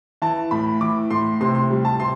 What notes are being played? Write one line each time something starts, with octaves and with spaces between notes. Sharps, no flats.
E3 A5
A2 B5
E3 D6
A2 C6
C3 C6
C6
G3
A5
C3 C6